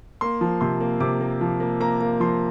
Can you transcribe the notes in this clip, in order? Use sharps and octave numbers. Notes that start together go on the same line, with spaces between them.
A#3 C6
F3
C3 C6
A#3
C3 D6
A#3
F3
A#3
A#3 A#5
A#3
F3 C6